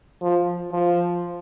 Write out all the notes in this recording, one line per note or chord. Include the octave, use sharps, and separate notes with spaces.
F3
F3